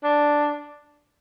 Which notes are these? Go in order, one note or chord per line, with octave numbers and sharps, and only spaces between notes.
D4